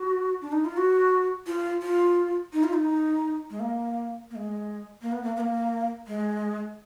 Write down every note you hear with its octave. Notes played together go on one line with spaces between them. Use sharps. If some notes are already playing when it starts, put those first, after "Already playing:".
Already playing: F#4
D4
D#4
F4
F#4
F4
F4
D#4
F4
D#4
G#3
A#3
A#3
G#3
A#3
B3
A#3
B3
A#3
G#3